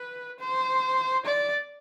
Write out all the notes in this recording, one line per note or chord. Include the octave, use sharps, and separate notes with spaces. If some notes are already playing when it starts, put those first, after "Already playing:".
Already playing: B4
C5
D5